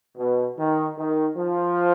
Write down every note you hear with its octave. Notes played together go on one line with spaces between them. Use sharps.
B2
D#3
D#3
F3